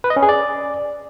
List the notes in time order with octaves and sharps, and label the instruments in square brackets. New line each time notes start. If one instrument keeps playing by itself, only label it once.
[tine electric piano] B4
D#5
C#4
G#4
D5